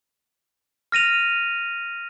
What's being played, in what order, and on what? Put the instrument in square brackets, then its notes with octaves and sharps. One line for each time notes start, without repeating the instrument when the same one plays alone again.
[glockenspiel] F6 A#6 D#7 F7